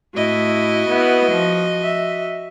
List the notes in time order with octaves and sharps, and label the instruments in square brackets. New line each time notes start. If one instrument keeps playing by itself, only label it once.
[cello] A2 E4 [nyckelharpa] F#4 D#5
[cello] B3 E4
F3
E5